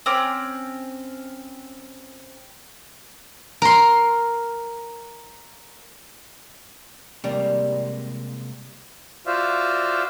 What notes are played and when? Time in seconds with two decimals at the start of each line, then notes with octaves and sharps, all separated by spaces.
0.06 C4 C#4 C6 D6
3.62 A#4 C6
7.24 C3 G3 G#3 A#3
9.27 F4 F#4 C5 D5 E5 F5